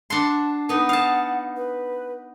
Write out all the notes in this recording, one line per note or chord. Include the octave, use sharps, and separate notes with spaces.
D4 F#5 A5 C6
B3 D#4 F#5
F5 A5
B4